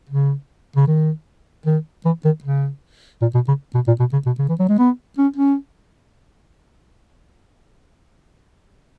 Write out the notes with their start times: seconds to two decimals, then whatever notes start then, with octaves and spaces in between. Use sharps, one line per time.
0.09 C#3
0.76 C#3
0.87 D#3
1.66 D#3
2.05 E3
2.25 D#3
2.44 C#3
3.22 A#2
3.34 B2
3.48 C#3
3.75 B2
3.87 A#2
4.00 B2
4.13 C#3
4.26 B2
4.39 C#3
4.49 E3
4.59 F#3
4.69 G#3
4.78 B3
5.18 C#4
5.36 C#4